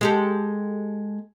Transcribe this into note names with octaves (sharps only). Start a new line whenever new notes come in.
G#3 G4 A4